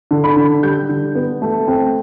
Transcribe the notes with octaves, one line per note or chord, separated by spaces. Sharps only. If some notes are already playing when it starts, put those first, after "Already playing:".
D3
B5
D3
G3 G6
D3
B3
A3
C4